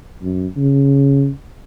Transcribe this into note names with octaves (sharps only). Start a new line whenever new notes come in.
F#2
C#3